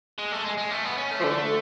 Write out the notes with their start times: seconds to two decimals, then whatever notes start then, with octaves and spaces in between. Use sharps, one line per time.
0.19 G#3
0.32 A3
0.44 G#3
0.57 G#3
0.71 A3
0.85 B3
0.97 C#4
1.11 A3
1.20 F3
1.24 D3